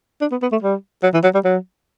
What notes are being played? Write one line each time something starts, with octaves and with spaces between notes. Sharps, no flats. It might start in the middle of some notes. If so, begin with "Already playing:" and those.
D4
B3
B3
A3
G3
F#3
E3
F#3
G3
F#3